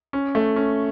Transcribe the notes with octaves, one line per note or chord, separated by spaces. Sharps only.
C#4
A3
C#4